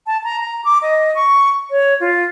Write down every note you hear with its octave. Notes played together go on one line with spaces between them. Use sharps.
A5
A#5
A#5
D6
D#5
C#6
C#5
F4